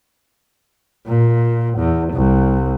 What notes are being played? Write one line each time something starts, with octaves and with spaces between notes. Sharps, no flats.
A#2
E2
C2